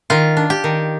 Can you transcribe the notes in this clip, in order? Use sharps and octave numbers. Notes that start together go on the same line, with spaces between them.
D#3 F4
D4
G4
D#3